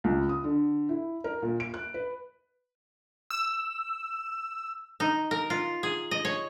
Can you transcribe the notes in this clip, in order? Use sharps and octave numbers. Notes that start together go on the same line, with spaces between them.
C#2
D#6
D3
E4
A#4
A#2
D7
F#6
B4
E6
D#4
A#4
F4
G#4
D#5
C#5